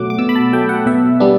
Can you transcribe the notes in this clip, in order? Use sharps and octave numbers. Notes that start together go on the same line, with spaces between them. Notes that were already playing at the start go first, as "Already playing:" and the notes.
Already playing: B2 F#3 A3 F#5 D6
D6
B2 E6
B5
A5
F#3 A3 G5
F#5
B2 E5
G3 B3 D4